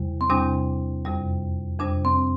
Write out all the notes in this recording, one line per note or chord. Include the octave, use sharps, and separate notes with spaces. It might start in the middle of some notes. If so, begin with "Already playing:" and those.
Already playing: E2 C3 G3
C4
E2 C3 G3 D4
F2 C3 G3
F2 C3 G3 D4
C4